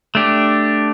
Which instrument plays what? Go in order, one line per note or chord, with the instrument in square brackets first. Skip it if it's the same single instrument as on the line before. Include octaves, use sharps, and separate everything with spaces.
[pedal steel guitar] A3 D4 G4